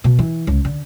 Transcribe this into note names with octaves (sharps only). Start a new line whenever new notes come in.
B2
E3
C#2
D3